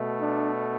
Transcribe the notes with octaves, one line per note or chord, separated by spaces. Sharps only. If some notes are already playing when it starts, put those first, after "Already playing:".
Already playing: B2 A3
D4